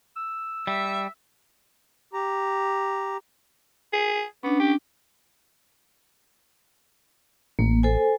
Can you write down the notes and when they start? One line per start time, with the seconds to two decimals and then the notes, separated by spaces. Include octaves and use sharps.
0.16 E6
0.67 G3 E5
2.13 G4 A#5
3.93 G#4
4.43 B3 C#4 D4
4.60 G4
7.59 A1 A#3
7.83 A4 C5 G#5